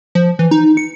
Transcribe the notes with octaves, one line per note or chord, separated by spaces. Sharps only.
F3
E3
D#4
C#7